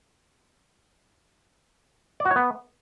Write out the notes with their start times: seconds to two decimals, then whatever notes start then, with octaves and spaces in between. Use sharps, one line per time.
2.20 D5
2.25 F#4
2.31 C#5
2.36 B3